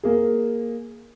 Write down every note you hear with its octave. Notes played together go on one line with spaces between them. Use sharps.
A#3 G#4